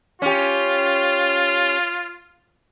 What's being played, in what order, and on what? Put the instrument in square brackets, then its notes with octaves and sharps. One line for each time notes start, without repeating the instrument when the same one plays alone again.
[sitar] C#4 G4 [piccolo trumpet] F4